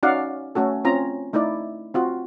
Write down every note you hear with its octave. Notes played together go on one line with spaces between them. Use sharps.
C#4 D#4 F#4 D5 F5 F#5
A3 C#4 F#4 A4
C4 C#4 F4 A#5
A3 D#4 E4 D5
C4 F4 F#4